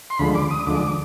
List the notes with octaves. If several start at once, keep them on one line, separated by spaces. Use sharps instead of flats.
C6
D2 D3 F3 G#3 B5
D6
D#6
D2 D3 F3 G#3 D6
D6